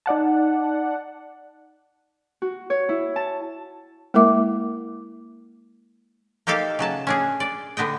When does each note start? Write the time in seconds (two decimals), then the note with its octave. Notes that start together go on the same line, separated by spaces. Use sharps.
0.06 D#4 D5 F#5 A5
2.42 F#4
2.70 C#5
2.89 E4
3.16 A5
4.14 G#3 A#3 E4 A#4 E5 D6
6.47 A#3 D#4 G4 A4 F5
6.79 C#3 F#3 A5
7.07 C#4 D4 G#4
7.40 D5
7.77 D3 B3 D#5 G5